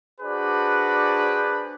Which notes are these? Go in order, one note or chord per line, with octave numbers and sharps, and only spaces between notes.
D4 F#4 G#4 B4 C5 D5